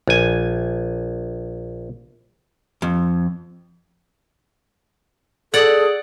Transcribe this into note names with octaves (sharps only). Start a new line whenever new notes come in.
A#1 G#5
F2
G#4 A4 D5 F#5 D#6